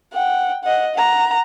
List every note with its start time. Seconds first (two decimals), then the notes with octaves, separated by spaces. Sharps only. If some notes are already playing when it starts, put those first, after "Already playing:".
0.13 F#5 G5
0.64 D#5 F#5
0.95 F#5 A#5